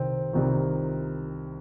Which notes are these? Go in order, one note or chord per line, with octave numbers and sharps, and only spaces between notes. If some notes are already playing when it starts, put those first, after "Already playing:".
Already playing: C2 C3 D#3 C4
C2 C3 D#3